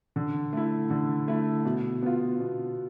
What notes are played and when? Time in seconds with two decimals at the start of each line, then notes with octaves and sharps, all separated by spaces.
0.16 D3
0.53 A3 E4
0.90 D3
1.28 A3 E4
1.66 B2
2.03 B3 F4
2.40 B2